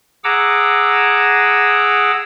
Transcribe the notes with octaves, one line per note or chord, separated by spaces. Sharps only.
G#4 F#5 A#5 D6 E6